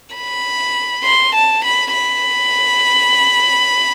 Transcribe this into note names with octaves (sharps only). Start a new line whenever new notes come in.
B5
C6
A5
B5
B5